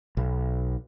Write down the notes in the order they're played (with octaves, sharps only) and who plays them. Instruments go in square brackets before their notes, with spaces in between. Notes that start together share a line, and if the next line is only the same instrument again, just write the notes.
[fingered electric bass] B1